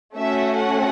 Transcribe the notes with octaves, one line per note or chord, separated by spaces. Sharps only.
A3 C#4 F#4 E5
F#5